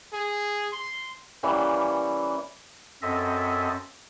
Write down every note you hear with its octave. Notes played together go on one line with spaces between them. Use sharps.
G#4
C6
E3 G3 A#3 C#4
F#2 C4 A4 D#5 E5